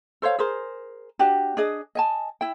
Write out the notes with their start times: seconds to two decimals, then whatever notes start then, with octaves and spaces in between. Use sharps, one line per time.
0.22 A4 C5 C#5 F5
0.39 G#4 A#4 C5
1.19 D4 F#4 G4
1.57 D4 G#4 D#5
1.95 D#5 G#5 A5
2.41 E4 G5